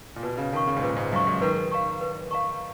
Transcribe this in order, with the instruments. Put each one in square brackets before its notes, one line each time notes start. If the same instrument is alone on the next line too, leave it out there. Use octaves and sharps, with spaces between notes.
[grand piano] A#2
[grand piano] B2 [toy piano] B4
[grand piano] C#3
[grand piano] D#3 [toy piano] F5 A#5 C#6
[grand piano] C#3
G#2
[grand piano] A#2 [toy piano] B4
[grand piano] G#2
[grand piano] F#2 [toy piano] F5 A#5 C#6
[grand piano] G#2
[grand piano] D#3 [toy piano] B4
[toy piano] F5 A#5 C#6
B4
F5 A#5 C#6